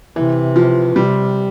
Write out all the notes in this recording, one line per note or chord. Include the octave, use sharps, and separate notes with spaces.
C3 E3
F3
C3 G3